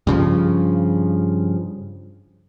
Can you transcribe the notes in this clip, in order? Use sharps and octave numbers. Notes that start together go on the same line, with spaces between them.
G2 C#3 F3